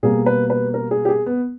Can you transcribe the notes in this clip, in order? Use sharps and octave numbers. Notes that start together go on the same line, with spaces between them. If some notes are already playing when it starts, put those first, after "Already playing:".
B2 G3 A#3 G#4
B4
B4
A#4
G#4
G4
G#4
B3